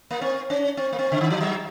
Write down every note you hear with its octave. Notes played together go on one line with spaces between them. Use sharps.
A#3
C4
C#4
C4
A#3
C4
C#3
D#3
F3
F#3